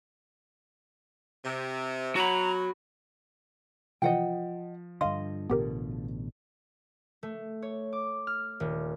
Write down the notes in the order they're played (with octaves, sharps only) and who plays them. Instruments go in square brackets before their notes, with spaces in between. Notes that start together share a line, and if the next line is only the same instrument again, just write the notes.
[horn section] C3
[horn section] F#3 [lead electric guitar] F#4 B5 [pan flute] A#5
[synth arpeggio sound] C3 E3 [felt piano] F3 [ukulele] D#5 F#5 G5
[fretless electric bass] G2 D3 [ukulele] D#5 [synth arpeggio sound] F5 C6
[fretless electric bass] A1 B2 D3 [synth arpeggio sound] B3 G4 A#4
[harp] A3
C#5
D6
F6
D#1